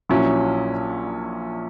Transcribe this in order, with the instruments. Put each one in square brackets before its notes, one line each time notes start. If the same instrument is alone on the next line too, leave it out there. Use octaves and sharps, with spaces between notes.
[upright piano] A#1 A#2 F#3 C#4 E4